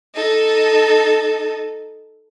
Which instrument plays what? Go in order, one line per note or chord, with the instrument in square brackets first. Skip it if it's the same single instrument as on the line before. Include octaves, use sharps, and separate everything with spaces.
[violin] D#4 A4